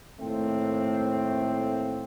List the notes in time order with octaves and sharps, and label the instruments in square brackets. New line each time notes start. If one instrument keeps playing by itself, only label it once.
[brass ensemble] A2 D#3 A3 A#3 C4